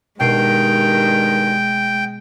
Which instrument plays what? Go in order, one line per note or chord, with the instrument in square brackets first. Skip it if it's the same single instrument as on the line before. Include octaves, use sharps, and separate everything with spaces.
[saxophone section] G2 D#3 [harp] B2 C7 D7 [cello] G#3 [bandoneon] G5